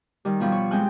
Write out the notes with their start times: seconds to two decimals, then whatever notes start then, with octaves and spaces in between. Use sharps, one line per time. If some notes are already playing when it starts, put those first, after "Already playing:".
0.25 D#3 G3
0.40 B2 F3 G3
0.52 C#5
0.71 G#3 C4 G5 G#5 F#6